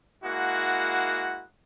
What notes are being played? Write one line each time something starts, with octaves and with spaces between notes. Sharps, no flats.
G#3 A#3 E4 F#4 F#5